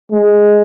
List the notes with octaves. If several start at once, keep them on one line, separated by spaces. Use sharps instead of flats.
G#3